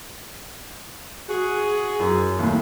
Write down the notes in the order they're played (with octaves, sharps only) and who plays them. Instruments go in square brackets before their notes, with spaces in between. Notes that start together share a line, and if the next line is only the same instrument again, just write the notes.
[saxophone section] F#4 G#4
[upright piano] F#2
D#2 A2